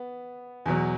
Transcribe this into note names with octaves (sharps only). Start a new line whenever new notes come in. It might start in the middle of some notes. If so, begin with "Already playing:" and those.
Already playing: B3
E2 B2 F#3